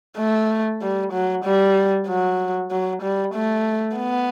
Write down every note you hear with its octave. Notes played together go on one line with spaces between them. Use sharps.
A3
G3
F#3
G3
F#3
F#3
G3
A3
B3